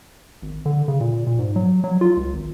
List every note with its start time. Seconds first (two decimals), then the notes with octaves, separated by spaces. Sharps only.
0.42 G#1
0.66 D3
0.88 C#3
1.00 A#2
1.27 A#2
1.39 G#2
1.56 F#3
1.84 F#3
2.01 F4
2.17 C#2
2.33 G#1